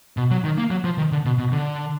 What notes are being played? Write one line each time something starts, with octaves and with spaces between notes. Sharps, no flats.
B2
F#3
D#3
A#3
F#3
F3
D#3
D3
B2
B2
D3